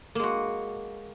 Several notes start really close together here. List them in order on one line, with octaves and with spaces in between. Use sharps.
A#3 G#3 F#4